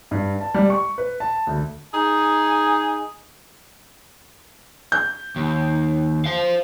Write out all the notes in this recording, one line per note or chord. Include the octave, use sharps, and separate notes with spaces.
G2
A5
G3
C#6
B4
A5
D2
D#4 G#4 G#5
G6
D#2
C5 F5